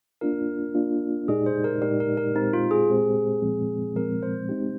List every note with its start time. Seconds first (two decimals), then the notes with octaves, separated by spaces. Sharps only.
0.21 A#3 D4 F4 A#4
0.75 A#3 D4 F4
1.28 A#2 G#3 D#4 G4 G#4 D5
1.46 C5
1.64 A#4
1.82 A#2 G#3 D#4 G4 A#4 D5
2.00 A#4
2.17 A#4
2.35 A#2 G#3 C4 D#4 G4 C5
2.53 F4
2.71 G#4
2.89 A#2 G#3 C4 G4 C5
3.42 A#2 F3 G#3 C4
3.96 A#2 F3 G#3 C4 A#4
4.22 C5
4.49 G#3 C4 D#4 G4